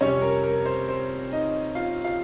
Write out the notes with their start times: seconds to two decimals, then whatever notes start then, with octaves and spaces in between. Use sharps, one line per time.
0.01 F2 C3 G3 C#4 C#5
0.22 A#4
0.44 A#4
0.66 C5
0.89 C5
1.32 D#4 D#5
1.75 F4 F5
2.04 F4 F5